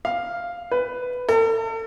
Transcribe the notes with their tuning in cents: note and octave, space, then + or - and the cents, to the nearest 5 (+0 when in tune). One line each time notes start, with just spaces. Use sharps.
F5 +0
B4 +10
A4 +40